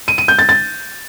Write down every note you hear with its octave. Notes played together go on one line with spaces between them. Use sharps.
D#7
D#7
G6
A6
A6